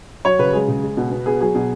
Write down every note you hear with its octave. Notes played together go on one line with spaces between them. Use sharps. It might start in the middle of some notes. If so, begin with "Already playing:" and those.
F#3 C#5
C#3 B4
G#3 G#4
C#3
G#3
B2
B3
B3 G#4
F#3 G#4
B2